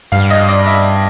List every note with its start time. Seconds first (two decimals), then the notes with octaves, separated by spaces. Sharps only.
0.12 G2 F5
0.30 D#5
0.49 D5
0.66 E5